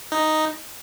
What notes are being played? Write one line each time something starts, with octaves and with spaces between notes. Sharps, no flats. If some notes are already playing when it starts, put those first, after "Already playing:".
D#4